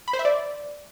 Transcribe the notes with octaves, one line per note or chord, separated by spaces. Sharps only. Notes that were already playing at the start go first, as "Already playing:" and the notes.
B5
C5
E5
D5